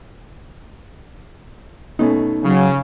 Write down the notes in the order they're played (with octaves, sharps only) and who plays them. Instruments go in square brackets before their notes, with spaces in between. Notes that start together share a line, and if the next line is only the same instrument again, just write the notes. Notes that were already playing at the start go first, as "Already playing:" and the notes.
[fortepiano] B2 A3 C#4 [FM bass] D#4
[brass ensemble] C#3 [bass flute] F#3